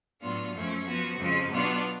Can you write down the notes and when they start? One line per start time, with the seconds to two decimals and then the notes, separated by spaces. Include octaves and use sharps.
0.21 A2 F#3 B3 D4 F4
0.54 F#2 F3 A3 C#4
0.85 F3 B3 F#4
1.18 F2 C#3 F3 G#3
1.51 B2 F#3 B3 D4 F4